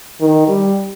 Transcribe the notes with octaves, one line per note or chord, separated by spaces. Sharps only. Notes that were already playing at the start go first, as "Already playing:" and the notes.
D#3
G3